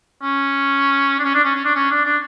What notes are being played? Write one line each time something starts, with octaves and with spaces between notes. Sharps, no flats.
C#4
D4
C#4
D4
C#4
C#4
D4
C#4
D4
D4